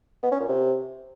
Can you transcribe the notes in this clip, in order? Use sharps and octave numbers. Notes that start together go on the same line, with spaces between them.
B3
C#4
A#2
C3